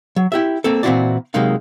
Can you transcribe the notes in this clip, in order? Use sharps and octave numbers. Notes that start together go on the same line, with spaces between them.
F#3
E4 G4 E5
A#3 C4 A4
A#2 E3 C4 E4 F#4 D5
C3 F#3 G#3 A#3 D#4 F5